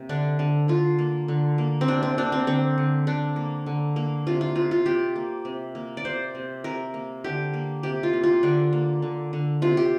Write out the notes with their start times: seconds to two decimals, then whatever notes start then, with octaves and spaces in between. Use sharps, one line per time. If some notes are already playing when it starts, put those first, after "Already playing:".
Already playing: C3 A#3
0.09 D3 D4
0.39 D3
0.68 D3 F4
0.99 A#3
1.28 D3
1.58 A#3
1.81 C4
1.88 C3 D4
2.03 C4
2.18 A#3 D4
2.32 C4
2.47 D3 C4
2.78 D3
3.07 D3 D4
3.36 A#3
3.66 D3
3.96 A#3
4.27 C3 F4
4.41 F4
4.55 C3 F4
4.71 F4
4.86 C3 G4
5.16 A#3
5.45 C3
5.75 A#3
5.97 D5
6.05 C3 C5
6.35 C3
6.64 C3 A#4
6.94 A#3
7.24 D3 G4
7.54 A#3
7.83 C3 G4
8.03 F4
8.13 A#3
8.24 F4
8.43 D3 D4
8.73 A#3
9.02 D3
9.33 D3
9.62 C3 F4
9.77 G4